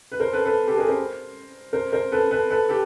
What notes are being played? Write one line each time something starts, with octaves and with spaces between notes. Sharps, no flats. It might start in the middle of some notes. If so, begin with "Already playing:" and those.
B4
A#4 C5
A4 B4
A4 B4
G4 A4
G#4 A#4
A#4 C5
A#4 C5
A#4 C5
A4 B4
A4 B4
A4 B4
G4 A4